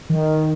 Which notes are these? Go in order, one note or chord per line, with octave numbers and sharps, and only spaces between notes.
D#3